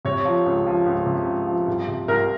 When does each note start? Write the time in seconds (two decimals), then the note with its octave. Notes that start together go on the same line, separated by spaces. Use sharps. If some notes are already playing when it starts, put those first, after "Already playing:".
0.05 C3 C#5
0.25 F3
0.46 C#2
0.66 F3
0.86 C#2
1.06 C3
1.26 C#2
1.47 F3
1.68 C2
1.88 C3
2.08 C2 A#4